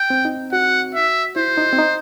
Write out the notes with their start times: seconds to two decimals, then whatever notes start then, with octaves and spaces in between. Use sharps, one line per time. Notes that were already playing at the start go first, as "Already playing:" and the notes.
Already playing: G5
0.10 C4
0.25 D#4
0.52 F#4 F#5
0.94 E5
1.36 E4 C5
1.57 D#4
1.73 C4
1.78 D#4